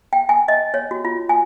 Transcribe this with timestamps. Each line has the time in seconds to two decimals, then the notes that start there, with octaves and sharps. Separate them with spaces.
0.13 G5
0.29 G#5
0.48 D#5
0.74 C#5
0.91 F#4
1.05 F4
1.29 G#5